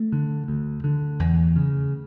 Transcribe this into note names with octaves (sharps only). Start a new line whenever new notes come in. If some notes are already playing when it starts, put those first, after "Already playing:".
Already playing: A3
D3
D2
D3
E2
C#3